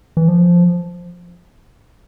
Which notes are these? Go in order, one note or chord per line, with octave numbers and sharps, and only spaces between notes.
E3
F3